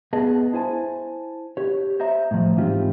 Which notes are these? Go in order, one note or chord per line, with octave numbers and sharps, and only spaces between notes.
B3 G#4 D#5 A5
E4 C5 G#5 A5
G4 C#5
C5 D#5 E5 A#5
A2 F3
G#2 E3 C4 D#4 F4 G4